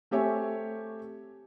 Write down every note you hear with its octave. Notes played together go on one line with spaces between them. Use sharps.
A3 C4 G4 C#5 E5 G#5